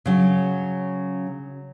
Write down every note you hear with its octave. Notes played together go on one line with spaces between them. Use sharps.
C#3 F#3